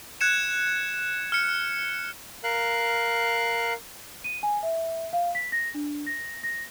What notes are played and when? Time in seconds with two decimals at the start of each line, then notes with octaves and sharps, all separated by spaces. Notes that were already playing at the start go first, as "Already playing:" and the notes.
0.21 F#6 G#6 C#7 E7
1.32 F6 C#7
2.44 A#4 F5 F#6
4.24 D#7
4.43 G#5
4.63 E5
5.13 F5
5.35 B6
5.52 A#6
5.74 D4
6.07 A#6
6.43 A#6